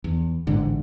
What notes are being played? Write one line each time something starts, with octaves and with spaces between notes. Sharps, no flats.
E2
A1 G#2 D3